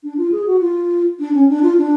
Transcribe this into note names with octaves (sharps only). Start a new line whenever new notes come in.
D4
F4
G#4
F#4
F4
D4
C#4
D4
F4
D4